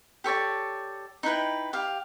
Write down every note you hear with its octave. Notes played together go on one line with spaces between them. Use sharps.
G4 A4 C#5 D5
D#4 E4 B4 G5
G4 F5